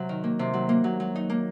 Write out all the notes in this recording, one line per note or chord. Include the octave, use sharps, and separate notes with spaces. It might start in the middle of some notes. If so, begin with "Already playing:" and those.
Already playing: C3 F#3
D#3
A#3
C3
F#3
A#3
F#3
F#3
D#4
A#3